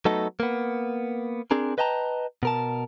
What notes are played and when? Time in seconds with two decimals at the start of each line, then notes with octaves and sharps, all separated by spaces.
0.05 F#3 A3 B3 D#4 A4
0.40 A#3 B3
1.51 C4 D4 G#4 A#4
1.78 B4 D#5 G5 A5 A#5
2.43 B2 A#4 A5